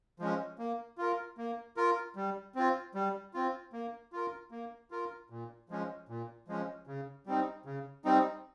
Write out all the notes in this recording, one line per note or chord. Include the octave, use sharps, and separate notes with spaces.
F3 G#3 C#4
A#3
F4 A#4
A#3
F4 A#4
G3
C4 F4
G3
C4 F4
A#3
F4 A#4
A#3
F4 A#4
A#2
F3 G#3 C#4
A#2
F3 G#3 C#4
C#3
G3 C4 D#4
C#3
G3 C4 D#4